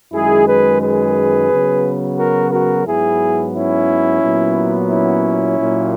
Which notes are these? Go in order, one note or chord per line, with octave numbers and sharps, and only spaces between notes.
F#2 D#3 G#3 E4 G#4
G#4 B4
G#4 B4
C#3 F#3 B3
F#4 A#4
F#4 A#4
G#2 F#3 B3 E4 G#4
C#4 E4
A#2 F#3 B3
C#4 E4
A#2 F#3 A#3